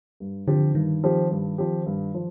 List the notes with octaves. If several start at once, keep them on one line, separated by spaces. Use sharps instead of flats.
G2
D3 F3 C4 G4
G2 D#3
F3 C4 G4
G2
F3 C4 G4
G2
F3